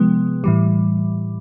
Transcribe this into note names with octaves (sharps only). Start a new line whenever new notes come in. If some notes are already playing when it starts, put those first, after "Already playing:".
Already playing: C3 F3 G#3 B3
A2 E3 G3